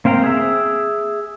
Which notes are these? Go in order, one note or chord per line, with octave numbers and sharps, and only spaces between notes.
A#3 C4 F5 G5 A#5
G#4 E5